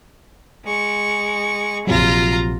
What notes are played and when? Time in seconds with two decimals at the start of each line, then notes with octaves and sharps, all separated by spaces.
0.65 G#3 C#6
1.87 A#1 C3 F#3 F4 A#5